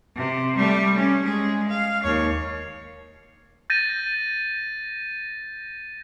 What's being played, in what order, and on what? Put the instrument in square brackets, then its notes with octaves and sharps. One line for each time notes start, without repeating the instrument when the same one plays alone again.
[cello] C3
G3 A3
C#4
G#3 G#4
F5
D#2 C#5
[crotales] G6 A6 A#6 D#7